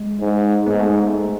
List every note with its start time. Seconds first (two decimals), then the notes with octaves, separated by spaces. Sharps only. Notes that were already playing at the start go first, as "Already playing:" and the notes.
Already playing: G#3
0.20 G#2
0.66 G#2 B3
0.80 A3
0.93 G#3
1.07 A3